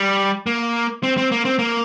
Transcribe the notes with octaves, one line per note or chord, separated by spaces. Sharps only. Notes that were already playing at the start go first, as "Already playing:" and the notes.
Already playing: G3
A#3
C4
C4
A#3
C4
A#3